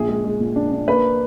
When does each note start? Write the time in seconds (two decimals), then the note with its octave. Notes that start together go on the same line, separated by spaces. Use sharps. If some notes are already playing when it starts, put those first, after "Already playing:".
Already playing: A#1 G#4
0.08 G#3
0.24 G#3
0.40 A#2
0.56 D4
0.72 D4
0.88 A#3 B4